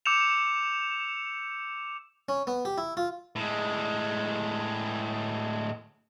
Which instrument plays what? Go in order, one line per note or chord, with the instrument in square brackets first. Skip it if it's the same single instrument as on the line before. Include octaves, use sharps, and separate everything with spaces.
[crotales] D6 E6 G6 C#7 E7 F7
[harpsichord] C#4
B3
G4
E4
F4
[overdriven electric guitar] A2 G#3